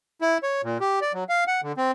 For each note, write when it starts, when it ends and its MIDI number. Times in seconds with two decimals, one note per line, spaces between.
0.21 0.38 64
0.43 0.62 73
0.64 0.78 46
0.80 0.99 67
1.01 1.12 74
1.14 1.24 54
1.29 1.44 77
1.47 1.61 78
1.63 1.72 50
1.77 1.91 60